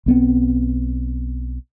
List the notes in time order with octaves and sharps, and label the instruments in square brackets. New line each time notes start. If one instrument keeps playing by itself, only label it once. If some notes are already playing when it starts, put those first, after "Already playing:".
[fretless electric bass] B1 B3 C4